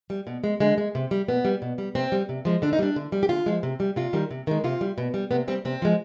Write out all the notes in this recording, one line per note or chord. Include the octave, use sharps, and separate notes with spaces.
G3
B2
G#3
D3 G#3
G#3
C3
G3
B2 B3
G3
B2
G3
C3 C4
G3
C3
F3 G#3
D3 D4
D#4
G3 D4
D3
G3
G4
D3 F4
F3 G#3
C3
G3
C3 F4
D#3 G3
C3
D#3 G#3
C3 F4
G3
B2
G3
C3 B3
G3 C4
C3 C4
F3 G#3